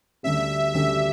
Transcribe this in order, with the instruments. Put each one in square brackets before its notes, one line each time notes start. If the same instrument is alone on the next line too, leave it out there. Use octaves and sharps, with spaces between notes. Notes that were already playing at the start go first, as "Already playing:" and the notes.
[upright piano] D2 D3 G3 C#4 G4 [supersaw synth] E5
[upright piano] D2 D3 G3 C#4 G4 [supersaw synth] E5